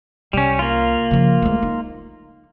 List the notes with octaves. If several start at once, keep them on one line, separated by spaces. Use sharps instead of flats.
C2 G3 C#4
A#3 F4
C#3 F3
D2 G#3
D#4